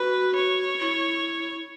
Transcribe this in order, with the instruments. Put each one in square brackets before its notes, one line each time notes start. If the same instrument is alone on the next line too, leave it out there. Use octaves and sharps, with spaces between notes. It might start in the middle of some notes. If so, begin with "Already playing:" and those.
Already playing: [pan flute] F#4 [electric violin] B4
[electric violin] C#5
[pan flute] E4